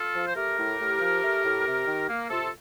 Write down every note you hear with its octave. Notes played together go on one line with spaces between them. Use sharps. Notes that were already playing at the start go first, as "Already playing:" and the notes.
Already playing: F4 A4
F3
C5
A3 G4 A#4
A2
A2
F3
A3
A2
C3
D#3
A#3
C3 F4 A4